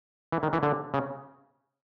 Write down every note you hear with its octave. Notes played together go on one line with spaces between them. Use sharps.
E3
D#3
E3
D3
C#3